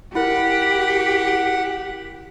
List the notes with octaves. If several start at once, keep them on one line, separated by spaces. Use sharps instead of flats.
E4 G4 A#4 F#5